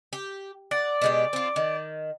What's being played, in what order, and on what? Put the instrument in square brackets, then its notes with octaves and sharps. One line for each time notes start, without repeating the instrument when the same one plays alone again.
[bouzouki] G4
[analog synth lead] D5 [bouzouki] F#5
[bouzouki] B2 G#3 G4
C4 F4
D#3